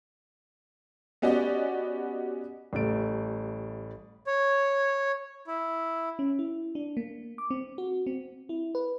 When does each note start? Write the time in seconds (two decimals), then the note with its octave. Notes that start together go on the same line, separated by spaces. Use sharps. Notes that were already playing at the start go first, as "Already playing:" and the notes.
1.22 B3 C#4 F#4 G4 D5 D#5
2.73 A1 G3 A3 D7
4.27 C#5
5.47 E4
6.19 C#4
6.39 E4
6.75 D4
6.97 A#3
7.38 D6
7.50 C4
7.78 F#4
8.07 C4
8.49 E4
8.75 B4